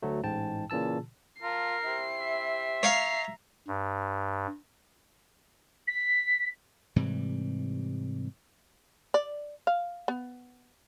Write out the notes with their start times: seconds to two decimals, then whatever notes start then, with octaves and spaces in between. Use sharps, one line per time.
0.02 D2 F#3 A3
0.23 A1 G#2 G5 A5
0.70 A#2 C#3 E3 A5 E6
1.42 F4 A#4 A5 C7
1.85 E4 G4 C5
2.21 E5
2.83 C#5 F5 A#5 C7
3.67 G2
5.87 B6
6.96 G#2 C3 E3 G3
9.14 D5
9.67 F5
10.08 B3